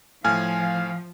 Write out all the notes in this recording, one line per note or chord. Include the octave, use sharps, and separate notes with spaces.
A2 F3 F5 G#5 F6